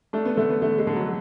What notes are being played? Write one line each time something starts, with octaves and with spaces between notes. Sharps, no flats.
A3 D4
B3
D3 A3
B3
D3 A3
G#3
D3
F#3